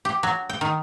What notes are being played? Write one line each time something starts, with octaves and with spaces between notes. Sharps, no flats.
G4
F#3
G5
D#3